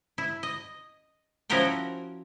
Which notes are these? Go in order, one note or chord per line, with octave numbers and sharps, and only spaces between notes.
E4
D#5
F3 C#4 E4 F#4 A#4 G5